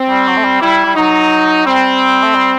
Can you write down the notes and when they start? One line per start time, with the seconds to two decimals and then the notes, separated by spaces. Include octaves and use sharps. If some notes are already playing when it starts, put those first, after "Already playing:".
Already playing: C4
0.09 G3
0.27 F#3
0.37 A3
0.44 G3
0.62 G3 E4
0.85 G3
0.96 F#3 D#4
1.65 G3 C4
2.23 A3
2.35 G3